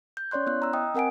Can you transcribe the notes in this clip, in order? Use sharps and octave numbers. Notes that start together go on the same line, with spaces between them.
G6
C#4 C#5 D5 C6 F#6
B3 E4 F#6
A#5 E6
D#5 G5 D#6
C4 A#4 F#5 G#5 D7